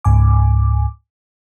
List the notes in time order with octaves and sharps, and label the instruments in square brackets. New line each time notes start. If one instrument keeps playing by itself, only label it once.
[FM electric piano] C#2 G#2 G#5 D6